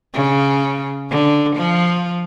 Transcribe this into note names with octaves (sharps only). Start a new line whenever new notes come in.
C#3
D3
F3